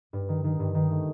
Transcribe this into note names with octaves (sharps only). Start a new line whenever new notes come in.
G2
D#3
D#3
G2
D#3
A3